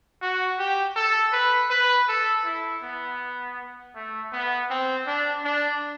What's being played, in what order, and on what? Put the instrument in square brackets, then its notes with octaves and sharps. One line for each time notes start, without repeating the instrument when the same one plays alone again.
[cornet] F#4
G4
A4
B4
B4
A4
E4
B3
A3
B3
C4
D4
D4